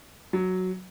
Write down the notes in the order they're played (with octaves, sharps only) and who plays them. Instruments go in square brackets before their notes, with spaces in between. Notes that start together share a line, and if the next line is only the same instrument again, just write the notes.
[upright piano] F#3